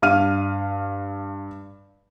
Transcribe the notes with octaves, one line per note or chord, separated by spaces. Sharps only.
G2 F5 F6 D#7